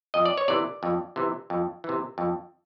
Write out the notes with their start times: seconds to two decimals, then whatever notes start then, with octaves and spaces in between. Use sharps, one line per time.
0.14 F2 D#5
0.26 D5
0.38 C#5
0.48 C3 E3 D5
0.83 F2
1.16 C3 E3
1.50 F2
1.84 C3 E3
2.18 F2